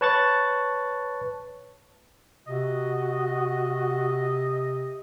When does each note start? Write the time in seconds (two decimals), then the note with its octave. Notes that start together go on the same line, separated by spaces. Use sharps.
0.01 B4 C#5 A5 C#6 F#6 A6
2.48 C3 F#4 D#5